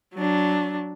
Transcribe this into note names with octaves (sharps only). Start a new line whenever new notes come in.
F#3 D4